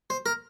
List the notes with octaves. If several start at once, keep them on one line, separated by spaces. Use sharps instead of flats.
C5
A#4